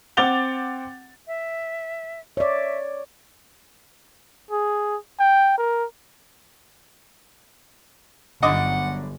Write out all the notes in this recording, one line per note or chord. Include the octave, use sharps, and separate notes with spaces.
C4 F#5 D6 A6 F7 G7
E5
C#5 D5 E5
G#4
G5
A#4
G1 F#2 D3 G3 D#5 F#5 D6